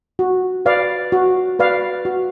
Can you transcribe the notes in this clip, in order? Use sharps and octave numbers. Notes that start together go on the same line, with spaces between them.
F#4
B4 D5 F5
F#4
B4 D5 F5
F#4